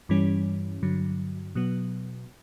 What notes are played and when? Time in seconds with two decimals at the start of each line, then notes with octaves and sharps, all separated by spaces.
0.09 G2 E3 G3 C#4
0.82 G2 D3 F#3
1.55 B2 F#3 B3